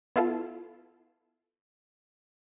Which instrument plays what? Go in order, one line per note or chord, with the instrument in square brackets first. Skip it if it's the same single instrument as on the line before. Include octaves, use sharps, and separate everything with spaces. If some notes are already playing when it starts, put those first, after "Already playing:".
[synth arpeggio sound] B3 E4 F4 A4